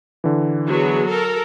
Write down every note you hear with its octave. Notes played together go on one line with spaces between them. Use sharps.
D3 E3
F#3 B3 G#4
A4 A#4